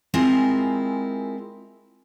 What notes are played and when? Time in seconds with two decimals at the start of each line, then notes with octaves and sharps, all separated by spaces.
0.14 G#3 C4 E4 F4 G#4 A#4